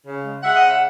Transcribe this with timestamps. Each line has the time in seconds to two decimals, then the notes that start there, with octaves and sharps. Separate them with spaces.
0.06 C#3
0.25 G#3
0.43 G#3 E5 F#5
0.56 D#5
0.62 C#3
0.68 E5